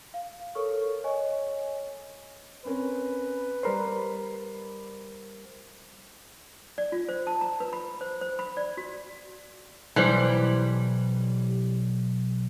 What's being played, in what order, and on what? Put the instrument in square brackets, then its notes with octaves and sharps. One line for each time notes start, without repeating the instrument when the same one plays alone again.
[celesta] F5
A4 A#4 C#5 C#6 F6
C#5 D#5 G#5 C#6
[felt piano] C4 C#4 A#4 [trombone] B4
[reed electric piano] G3 A#4 C5 [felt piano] D5 B5 C7
[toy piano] D5
F4
C5
A5
A#5
B4
B5
C5
C5
B5
D5
F#4
[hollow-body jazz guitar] B1 [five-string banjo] E3 G3 C5